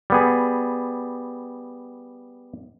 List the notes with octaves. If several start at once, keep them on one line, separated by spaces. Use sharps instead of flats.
G3 B3 G#4